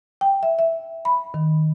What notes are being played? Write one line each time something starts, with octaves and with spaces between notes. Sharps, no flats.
G5
E5
E5
B5
D#3